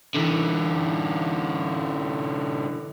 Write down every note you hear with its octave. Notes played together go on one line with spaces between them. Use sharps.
D3 E3